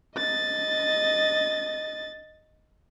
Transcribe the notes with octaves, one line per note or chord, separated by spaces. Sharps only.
D#5 A6